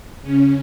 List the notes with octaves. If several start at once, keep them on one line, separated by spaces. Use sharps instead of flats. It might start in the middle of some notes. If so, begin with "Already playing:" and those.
C#3 C#4